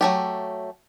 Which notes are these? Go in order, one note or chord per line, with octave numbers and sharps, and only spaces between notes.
F#3 A3 G4